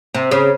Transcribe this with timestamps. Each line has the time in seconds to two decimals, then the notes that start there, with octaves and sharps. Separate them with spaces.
0.14 C3
0.31 C#3